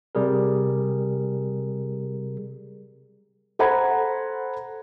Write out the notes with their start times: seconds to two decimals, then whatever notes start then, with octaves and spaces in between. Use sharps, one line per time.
0.15 C3 G3 G#4 A#4
3.59 A4 C5 F#5 A#5 B5 G#6